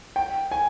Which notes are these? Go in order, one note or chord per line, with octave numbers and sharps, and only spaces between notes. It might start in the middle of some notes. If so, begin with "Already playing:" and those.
G5
G#5